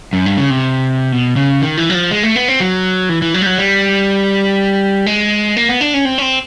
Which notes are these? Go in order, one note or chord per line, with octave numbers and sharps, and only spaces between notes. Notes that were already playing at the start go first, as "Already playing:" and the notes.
F#2
G2
C#3
C3
B2
C#3
D#3
E3
F#3
F3
G#3
A3
B3
C4
F#3
E3
E3
F#3
G3
F#3
G3
G#3
A#3
B3
D4
C#4
C4
C#4
C4